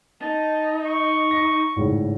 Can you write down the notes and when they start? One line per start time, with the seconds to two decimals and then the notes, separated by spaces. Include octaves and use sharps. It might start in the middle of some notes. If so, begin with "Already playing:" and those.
0.22 D#4 A5
0.85 C#6
1.31 A#6
1.76 G#1 A2 C#3